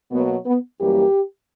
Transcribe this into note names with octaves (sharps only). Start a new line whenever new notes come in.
B2 F#3 A#3 B3
B3
F#2 E3 G3 A#3 G4